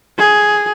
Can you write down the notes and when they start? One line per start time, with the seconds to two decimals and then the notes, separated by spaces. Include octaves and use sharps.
0.18 G#4